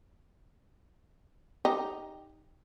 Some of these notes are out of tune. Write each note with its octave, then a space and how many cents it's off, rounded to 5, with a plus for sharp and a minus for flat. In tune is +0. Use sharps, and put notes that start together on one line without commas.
D#4 +0 G4 +0